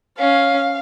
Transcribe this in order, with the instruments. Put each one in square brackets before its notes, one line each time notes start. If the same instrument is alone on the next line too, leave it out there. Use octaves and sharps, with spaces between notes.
[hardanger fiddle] C#4 [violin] F5